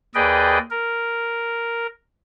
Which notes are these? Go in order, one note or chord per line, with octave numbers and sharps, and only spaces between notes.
D#2 G#4 B4 D5 D#5 G5
A#4